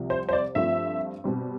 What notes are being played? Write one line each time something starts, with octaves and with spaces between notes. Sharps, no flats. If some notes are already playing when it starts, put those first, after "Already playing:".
Already playing: C2 C3 F3
C5
C5
D5
G2 F3 A3 C4 E5
B2 G3 C4